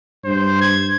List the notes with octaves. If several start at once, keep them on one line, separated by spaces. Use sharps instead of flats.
G2 C5
G#6